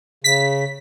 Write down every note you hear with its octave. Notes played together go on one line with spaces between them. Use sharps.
C#3 B6